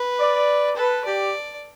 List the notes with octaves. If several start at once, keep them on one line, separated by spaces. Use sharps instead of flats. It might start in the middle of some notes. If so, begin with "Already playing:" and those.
Already playing: B4
D5
A4 B4
G4 D5